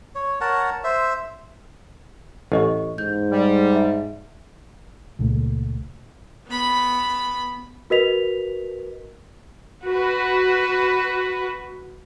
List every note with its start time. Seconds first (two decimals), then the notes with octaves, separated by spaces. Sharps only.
0.15 C#5
0.41 A#4 C#5 F#5 A5
0.84 C5 E5
2.52 A1 G4 D#5 C#6
2.98 G#2 G6
3.32 G3
3.75 E5
5.19 C#2 A#2 A3
6.47 B3 B5
7.90 F#4 A#4 B4 D#5 B6 F7
9.86 F#4 B4